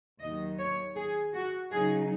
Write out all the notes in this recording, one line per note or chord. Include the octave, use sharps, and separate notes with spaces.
D#2 D#3 F#3 D#5
C#5
G#4
F#4
C#3 F#3 D#4 G#4